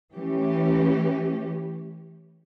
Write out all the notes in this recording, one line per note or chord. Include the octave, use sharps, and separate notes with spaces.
E3 A3 C#4 G4